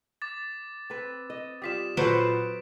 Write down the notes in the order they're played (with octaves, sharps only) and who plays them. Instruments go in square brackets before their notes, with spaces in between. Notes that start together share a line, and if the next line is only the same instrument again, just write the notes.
[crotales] D6 A6
[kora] C4 B4
D#5
[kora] G3 F4 G4 [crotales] D#6 B6 E7
[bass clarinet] A#2 [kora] F#3 F#4 A4 [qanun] B4 C5 F#5 [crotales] D7